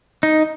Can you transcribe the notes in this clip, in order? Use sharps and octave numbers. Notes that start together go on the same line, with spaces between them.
D#4